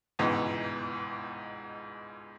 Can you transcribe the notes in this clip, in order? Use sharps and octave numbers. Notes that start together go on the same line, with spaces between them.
G1 C#2 G#2 B2 E3